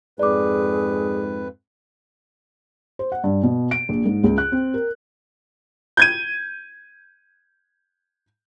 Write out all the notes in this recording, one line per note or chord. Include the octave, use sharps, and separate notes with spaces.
F2 G#2 G#4 B4 D5 D6
C5
F#5
G2
B2
D7
A#1
G#2
C#2
F#6
C4
A#4
G6 G#6 D#7